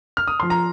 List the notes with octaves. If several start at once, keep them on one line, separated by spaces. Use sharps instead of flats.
F6
D#6
F3 C6
A#5